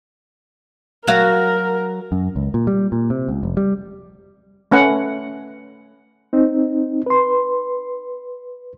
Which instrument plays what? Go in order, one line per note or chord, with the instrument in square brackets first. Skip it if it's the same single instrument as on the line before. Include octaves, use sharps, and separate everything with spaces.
[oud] F#3 F#4 F5 [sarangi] A#4
[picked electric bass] F#2
C#2
A#2
G3
A#2
C3
C#2
F1
G3
[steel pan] A3 C#4 B4 F#5
[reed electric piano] C4 D#4
B4 C6